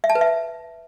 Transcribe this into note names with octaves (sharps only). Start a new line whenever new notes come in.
E5
A5
B4
E5